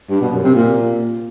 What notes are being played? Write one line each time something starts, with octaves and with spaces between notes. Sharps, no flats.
G2
B2
F#2
C3
A#2